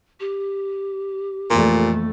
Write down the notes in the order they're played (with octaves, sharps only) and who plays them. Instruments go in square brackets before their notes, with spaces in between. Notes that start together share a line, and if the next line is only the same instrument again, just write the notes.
[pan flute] G4
[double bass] F2 A3 [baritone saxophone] A#2 [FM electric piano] E3 A#3 D5